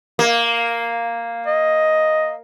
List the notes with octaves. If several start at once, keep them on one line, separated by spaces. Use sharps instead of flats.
A#3
D#5